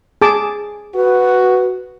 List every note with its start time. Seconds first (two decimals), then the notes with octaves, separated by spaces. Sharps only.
0.22 G#4 A5 D6
0.95 F#4 B4